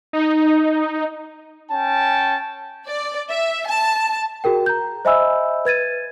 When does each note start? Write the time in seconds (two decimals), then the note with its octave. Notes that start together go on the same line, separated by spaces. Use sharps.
0.13 D#4
1.71 C#4 G5 A5
2.87 D5
3.30 E5
3.67 A5
4.44 F#4 G#4 A#4 G5
4.66 A#5 G6
5.05 C5 D#5 E5 G#5 B5 E6
5.65 B4 G#6 A6 D#7